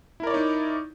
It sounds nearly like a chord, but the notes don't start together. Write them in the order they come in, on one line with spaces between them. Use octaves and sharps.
E4 A#4 D5 C#5 D#4